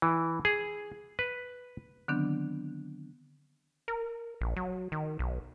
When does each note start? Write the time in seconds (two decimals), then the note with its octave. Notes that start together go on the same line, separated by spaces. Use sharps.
0.02 E3
0.45 G#4
1.19 B4
2.08 D3 D#3 F#3 B3 C4 D4
3.88 A#4
4.41 A#1
4.56 F#3
4.92 D#3
5.19 B1